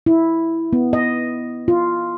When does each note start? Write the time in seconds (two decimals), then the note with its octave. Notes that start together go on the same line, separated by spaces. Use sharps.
0.06 E4
0.73 B3
0.93 D#5
1.68 F4